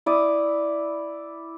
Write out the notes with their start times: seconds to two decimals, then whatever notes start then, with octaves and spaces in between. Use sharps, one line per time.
0.06 E4 D5 D#6